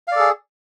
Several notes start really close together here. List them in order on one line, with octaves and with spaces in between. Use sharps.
F5 D5 A4 G#4